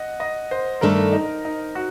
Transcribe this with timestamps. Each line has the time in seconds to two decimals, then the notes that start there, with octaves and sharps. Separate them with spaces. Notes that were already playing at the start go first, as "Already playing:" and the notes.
Already playing: D#5 F#5
0.20 D#5
0.51 C5
0.81 G2 D#3 A3 D4 A4 A#4
1.12 D#4
1.45 D#4
1.75 F#4